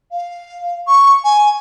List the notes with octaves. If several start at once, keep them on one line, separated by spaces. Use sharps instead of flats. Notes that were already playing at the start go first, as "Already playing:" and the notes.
F5
C#6
G#5